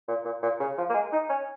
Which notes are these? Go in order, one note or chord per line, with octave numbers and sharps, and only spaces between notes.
A#2
A#2
A#2
C#3
F3
A#3
G#3
D#4
C#4